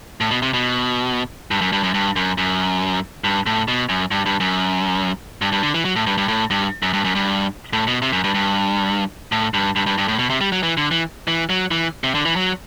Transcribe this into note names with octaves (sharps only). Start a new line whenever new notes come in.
A2
B2
C3
B2
G2
F#2
G2
F#2
G2
F#2
F#2
G2
A2
B2
F#2
G2
G2
F#2
G2
G2
D3
E3
F#3
A2
G2
G2
A2
G2
F#2
G2
F#2
G2
A2
B2
C3
F#2
G2
G2
A2
G2
G2
G2
G2
A2
B2
C3
G3
F#3
E3
D3
E3
E3
F#3
E3
C3
D3
E3
F#3